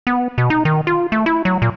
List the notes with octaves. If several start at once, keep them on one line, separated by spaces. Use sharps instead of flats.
B3
B2
D#4
D#3
F4
A3
E4
F#3
A#2